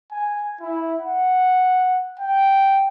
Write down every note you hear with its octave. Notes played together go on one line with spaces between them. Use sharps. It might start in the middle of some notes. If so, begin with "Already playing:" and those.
G#5
E4
F#5
G5